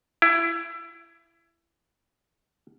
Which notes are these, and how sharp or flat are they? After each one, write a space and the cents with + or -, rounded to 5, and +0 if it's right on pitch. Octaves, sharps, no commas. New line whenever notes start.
E4 +25